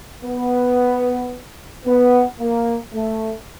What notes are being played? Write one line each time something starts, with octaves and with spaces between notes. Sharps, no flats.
B3
B3
A#3
A3